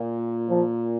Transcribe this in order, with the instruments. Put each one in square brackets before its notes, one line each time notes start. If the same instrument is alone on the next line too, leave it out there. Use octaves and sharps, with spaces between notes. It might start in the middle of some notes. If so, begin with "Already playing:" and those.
Already playing: [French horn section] A#2
[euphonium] F3